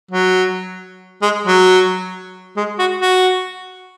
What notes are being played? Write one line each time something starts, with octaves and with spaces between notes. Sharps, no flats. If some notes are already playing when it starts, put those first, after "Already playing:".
F#3
G#3
F#3
G#3
F#4
F#4